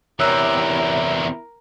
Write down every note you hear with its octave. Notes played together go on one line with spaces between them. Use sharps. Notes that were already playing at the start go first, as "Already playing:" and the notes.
E2 C3 E4 A#4 C#5 E6 F#6